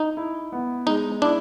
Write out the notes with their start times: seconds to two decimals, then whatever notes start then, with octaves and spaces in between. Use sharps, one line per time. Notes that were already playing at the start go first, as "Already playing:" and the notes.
Already playing: D#4
0.17 E4
0.52 B3
0.87 G#3 D#4
1.22 D4 E4